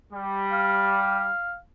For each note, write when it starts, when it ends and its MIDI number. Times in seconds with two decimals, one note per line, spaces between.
0.13 1.29 55
0.52 1.57 77